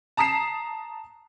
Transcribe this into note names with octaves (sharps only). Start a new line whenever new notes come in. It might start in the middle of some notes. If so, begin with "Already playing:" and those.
A5 A#5 D#6 B6 C7 E7